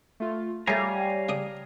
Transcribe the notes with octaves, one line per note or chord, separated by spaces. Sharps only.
A3 F4
G3 A3 G#4 C#5 F5 G#5 A#5
C#3 D4 D#6